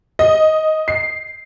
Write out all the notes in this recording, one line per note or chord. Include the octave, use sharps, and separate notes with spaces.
D#5
C7